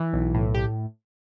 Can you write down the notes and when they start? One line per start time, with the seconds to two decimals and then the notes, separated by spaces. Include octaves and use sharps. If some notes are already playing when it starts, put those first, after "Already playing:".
Already playing: E3
0.13 B1
0.34 A2
0.55 G4